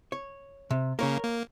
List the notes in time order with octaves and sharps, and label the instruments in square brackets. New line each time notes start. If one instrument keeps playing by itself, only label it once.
[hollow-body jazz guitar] C#5
C3
[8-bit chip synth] C#3 A#3 [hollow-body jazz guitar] A#4 C#5
[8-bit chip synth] A#3